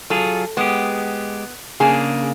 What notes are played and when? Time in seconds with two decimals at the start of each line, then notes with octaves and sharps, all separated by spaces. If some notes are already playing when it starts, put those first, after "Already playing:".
0.10 F#3 F4 G#4 A4
0.57 G#3 B3 G4
1.80 C#3 A#3 D4 G#4